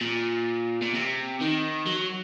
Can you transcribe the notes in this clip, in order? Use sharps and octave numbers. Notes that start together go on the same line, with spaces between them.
A#2
A#2
C3
D#3
F#3